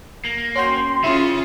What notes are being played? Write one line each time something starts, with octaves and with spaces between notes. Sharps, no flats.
A#3
C#4 F#4 G5 C6
C#3 C#4 E4 F4 G#4